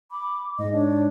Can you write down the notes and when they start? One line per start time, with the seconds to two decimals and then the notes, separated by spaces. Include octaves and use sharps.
0.11 B5 D6
0.58 G#2 D#5
0.72 D4 C#5